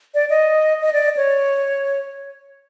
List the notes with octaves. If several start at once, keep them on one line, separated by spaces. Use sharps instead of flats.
D5
D#5
D#5
D5
C#5